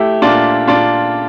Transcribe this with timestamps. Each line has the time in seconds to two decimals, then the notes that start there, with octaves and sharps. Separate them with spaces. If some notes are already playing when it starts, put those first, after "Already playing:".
Already playing: A3 E4 G4
0.22 A#2 D4 F4
0.68 A#2 D4 F4